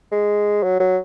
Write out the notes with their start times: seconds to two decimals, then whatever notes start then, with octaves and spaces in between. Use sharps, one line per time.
0.12 G#3
0.63 F#3
0.80 F#3